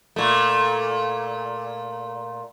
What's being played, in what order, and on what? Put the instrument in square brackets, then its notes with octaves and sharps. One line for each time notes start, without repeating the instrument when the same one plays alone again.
[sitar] A#2 A3